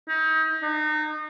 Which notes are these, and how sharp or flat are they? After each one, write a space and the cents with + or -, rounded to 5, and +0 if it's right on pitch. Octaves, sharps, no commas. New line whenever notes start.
D#4 +35
D#4 -30